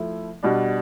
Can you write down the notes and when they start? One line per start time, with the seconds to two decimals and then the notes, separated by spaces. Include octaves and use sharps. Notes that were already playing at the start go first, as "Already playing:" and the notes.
Already playing: F3 A3 E4
0.43 B2 G3 D4